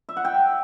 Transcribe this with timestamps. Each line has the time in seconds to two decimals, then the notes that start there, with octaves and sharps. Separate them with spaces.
0.09 E5
0.17 F#5
0.25 G5